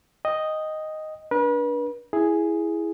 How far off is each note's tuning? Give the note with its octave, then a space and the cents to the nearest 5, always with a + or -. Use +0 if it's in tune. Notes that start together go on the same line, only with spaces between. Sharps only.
D#5 +0 G5 +0
D4 -15 B4 -40
E4 +0 G#4 +0